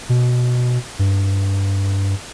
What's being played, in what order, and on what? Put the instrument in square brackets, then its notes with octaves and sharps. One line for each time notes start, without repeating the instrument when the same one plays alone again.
[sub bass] B2
G2